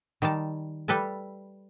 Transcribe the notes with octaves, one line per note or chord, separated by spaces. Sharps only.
D#3 G3 D#4 A5
G3 A4 B4 E5 A5